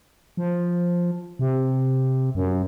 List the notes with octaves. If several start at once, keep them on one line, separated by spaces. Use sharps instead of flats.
F3
C3
F#2